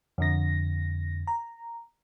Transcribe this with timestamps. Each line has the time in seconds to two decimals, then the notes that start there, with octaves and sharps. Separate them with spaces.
0.18 F2 D3 A#6
1.27 A#5